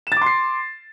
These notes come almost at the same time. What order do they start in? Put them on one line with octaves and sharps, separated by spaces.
E7 A6 D6 C6 C7